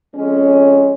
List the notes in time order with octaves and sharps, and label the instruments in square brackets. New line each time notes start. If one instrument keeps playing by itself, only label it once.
[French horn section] F2 G#3 C#4